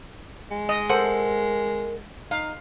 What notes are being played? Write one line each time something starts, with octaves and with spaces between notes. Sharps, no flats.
G#3
D#5
A4 A#4 C5 F#5
D#4 F5